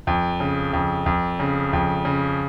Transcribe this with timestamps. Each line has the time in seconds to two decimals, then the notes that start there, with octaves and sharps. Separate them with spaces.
0.07 F2
0.40 C#3
0.73 F2
1.06 F2
1.40 C#3
1.73 F2
2.05 C#3